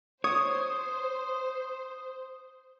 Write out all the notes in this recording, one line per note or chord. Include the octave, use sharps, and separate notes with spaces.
C5 C#5 D#6